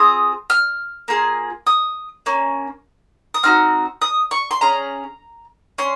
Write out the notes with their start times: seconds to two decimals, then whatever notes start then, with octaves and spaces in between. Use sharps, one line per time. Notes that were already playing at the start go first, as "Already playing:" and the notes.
Already playing: C4 F4 G#4 D#6
0.50 F6
1.08 A#3 F4 G#4
1.67 D#6
2.26 A#3 C#4
3.34 D#6
3.43 C4 D#4 F#4 F6
4.02 D#6
4.31 C#6
4.51 C6
4.61 C#4 G#4 A#5
5.78 C#4 C6